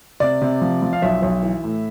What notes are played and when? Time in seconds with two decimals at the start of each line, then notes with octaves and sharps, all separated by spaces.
0.20 C3 D5
0.42 C3
0.62 F3
0.82 F3
0.93 F5
1.02 B1 E5
1.22 B1
1.43 E3
1.64 A2